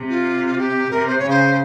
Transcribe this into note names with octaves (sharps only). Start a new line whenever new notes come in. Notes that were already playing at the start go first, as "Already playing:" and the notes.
Already playing: C3
F4
G4
C3 A#4
C5
C#3 C#5
C5